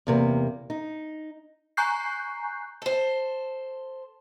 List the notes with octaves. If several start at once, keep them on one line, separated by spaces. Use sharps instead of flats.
E2 C3 A#3
D#4
G#5 A#5 C#6 F#6 G6 C7
A4 C5